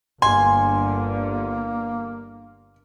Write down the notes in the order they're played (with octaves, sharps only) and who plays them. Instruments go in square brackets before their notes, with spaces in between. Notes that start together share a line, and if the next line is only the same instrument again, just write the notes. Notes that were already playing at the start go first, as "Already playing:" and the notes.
[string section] G1 D3 [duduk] A#3 [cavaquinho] G#5 [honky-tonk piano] C6